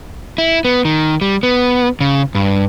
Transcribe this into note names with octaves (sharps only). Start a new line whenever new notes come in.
E4
B3
D#3
G3
B3
C#3
G2